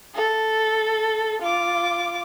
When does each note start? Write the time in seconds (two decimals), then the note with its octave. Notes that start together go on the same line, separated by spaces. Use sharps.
0.15 A4
1.42 F4 D6